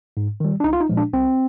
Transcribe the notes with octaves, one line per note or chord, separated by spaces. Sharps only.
G#2
D#3 G3
D4
C2 D#4
F4
D#4
A#2 F3 G#3
D4
C2 C4